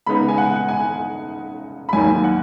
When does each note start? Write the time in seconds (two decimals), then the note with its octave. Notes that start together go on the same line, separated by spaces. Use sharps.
0.06 C#3 G#3 B3 D#4 B5
0.28 G#5
0.38 F#5
0.68 G#5
1.89 B5
1.93 D#2 D#3 F#3 G#5
2.24 F#5